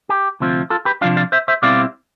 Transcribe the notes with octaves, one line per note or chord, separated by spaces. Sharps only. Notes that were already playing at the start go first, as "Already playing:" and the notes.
G4
D2 C3 F3 C4 F4
F4 A4
G4 B4
C3 F3 A3 D4 F4 D5 F5
D5 F5
C5 E5
C5 E5
B2 G3 C4 E4 D5 F5